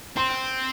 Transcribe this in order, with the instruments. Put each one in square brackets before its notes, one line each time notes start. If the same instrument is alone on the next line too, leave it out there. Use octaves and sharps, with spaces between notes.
[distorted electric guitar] C4 [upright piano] C6